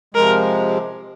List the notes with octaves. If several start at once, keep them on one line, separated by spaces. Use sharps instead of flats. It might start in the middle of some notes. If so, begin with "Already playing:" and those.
C3 F3 G#3 A#4